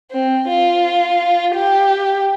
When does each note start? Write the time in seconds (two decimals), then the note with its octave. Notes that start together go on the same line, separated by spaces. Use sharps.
0.12 C4
0.48 F4
1.55 G4